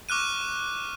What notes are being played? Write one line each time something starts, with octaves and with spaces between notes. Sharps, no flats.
C#6 D6 F6 F#6 D#7